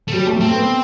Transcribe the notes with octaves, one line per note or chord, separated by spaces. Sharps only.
A3
F#3 G3
A3
A3 C4
B3